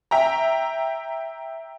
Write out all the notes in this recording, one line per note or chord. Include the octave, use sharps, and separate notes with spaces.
E5 G5 A#5